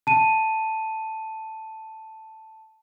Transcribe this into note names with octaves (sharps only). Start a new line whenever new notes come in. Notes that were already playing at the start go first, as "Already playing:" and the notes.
A5 D#7